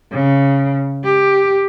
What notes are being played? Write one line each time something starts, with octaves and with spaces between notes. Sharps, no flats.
C#3
G4